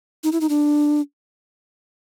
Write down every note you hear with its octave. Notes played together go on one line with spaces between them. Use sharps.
D#4
E4
D#4
D4